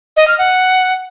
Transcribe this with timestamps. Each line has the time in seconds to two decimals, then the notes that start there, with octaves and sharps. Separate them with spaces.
0.17 D#5
0.28 F6
0.39 F#5